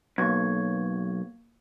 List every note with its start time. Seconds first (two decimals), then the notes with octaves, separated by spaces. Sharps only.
0.18 B1 A#3 C#6 G#6